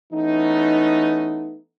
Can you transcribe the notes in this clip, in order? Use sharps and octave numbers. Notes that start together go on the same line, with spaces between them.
E3 A3 B3 C#4 D#4